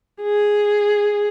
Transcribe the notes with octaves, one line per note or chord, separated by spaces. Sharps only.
G#4